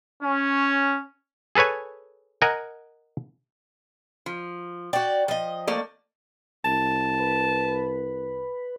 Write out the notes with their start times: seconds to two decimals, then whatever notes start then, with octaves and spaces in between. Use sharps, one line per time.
0.22 C#4
1.55 G#4 A4 B4 C#5 G#5
2.42 A#4 D#5 F#5 G#5
4.26 F3
4.93 F#4 D5 G5
5.28 F3 D#5
5.67 A3 A#3 D5
6.65 C2 A5
7.20 B4